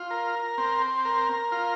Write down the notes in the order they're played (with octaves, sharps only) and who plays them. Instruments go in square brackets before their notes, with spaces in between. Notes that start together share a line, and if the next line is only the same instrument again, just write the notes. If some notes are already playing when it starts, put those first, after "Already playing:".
Already playing: [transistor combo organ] F4
A#4
C4
A#4
F4